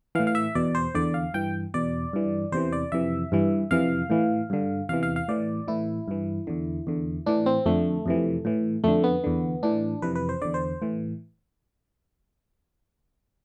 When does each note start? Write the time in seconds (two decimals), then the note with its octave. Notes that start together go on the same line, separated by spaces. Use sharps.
0.15 E3 F5
0.19 A2
0.27 F5
0.35 E5
0.55 E2 B2 D5
0.75 C5
0.95 E2 D3 D5
1.14 F5
1.34 G2 E3 G5
1.74 E2 B2 D5
2.13 G2 E3
2.52 E2 C3 E3 C5
2.72 D5
2.92 F2 C3 E3 E5
3.32 G2 E3
3.71 F2 C3 E3 F5
4.10 A2 E3
4.50 G2 D3
4.89 E2 C3 E3 F5
5.03 F5
5.16 F5
5.28 A2 E3 D5
5.68 A2 E3 E4
6.08 G2 E3
6.47 E2 D3
6.87 E2 D3
7.26 A2 E3 D4
7.46 C4
7.66 F2 D3 A3
8.06 F2 C3 E3
8.45 A2 E3
8.84 F2 D3 A3
9.04 B3
9.24 E2 D3
9.63 A2 E3 D4
10.02 F2 C3 E3 B4
10.15 B4
10.29 C5
10.42 E2 D3 D5
10.54 C5
10.82 A2 E3